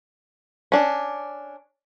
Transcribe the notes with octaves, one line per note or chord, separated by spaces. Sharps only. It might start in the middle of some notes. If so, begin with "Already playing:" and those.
C#4 D4